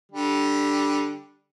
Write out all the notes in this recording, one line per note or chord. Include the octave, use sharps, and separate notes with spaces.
D3 G3